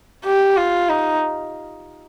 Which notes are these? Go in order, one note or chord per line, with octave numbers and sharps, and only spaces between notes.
G4
F4
D#4